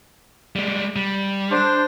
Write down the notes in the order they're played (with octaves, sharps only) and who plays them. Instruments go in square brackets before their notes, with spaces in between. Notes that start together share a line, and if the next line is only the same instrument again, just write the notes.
[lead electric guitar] G3 G#3
G3
[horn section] D4 C5